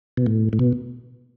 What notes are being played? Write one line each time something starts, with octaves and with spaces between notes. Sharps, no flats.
B2
A2
A2
B2